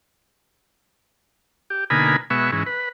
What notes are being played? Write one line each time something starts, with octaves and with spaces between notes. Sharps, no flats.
G4
B2 D3 A#3 D#4 G#5 B5
B2 G#3 B3 E5 C#6
G#2 E3 C#4
B4